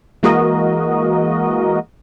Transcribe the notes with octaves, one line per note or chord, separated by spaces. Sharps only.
E3 G#3 A#3 F#4 A#4 D#5